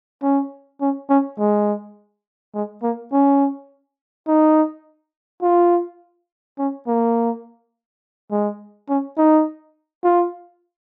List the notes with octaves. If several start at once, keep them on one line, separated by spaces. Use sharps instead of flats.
C#4
C#4
C#4
G#3
G#3
A#3
C#4
D#4
F4
C#4
A#3
G#3
C#4
D#4
F4